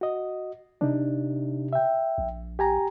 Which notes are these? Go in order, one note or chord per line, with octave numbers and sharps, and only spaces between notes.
F#4 D#5
C3 D4 D#4
E5 G5
A#1
G4 G#5 A#5